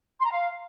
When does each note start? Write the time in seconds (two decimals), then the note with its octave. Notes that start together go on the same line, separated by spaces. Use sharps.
0.19 C6
0.24 A#5
0.30 F5